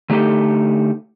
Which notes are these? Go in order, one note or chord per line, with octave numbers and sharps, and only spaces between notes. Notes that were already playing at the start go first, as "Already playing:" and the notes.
D3 A3 D#4 G4 A4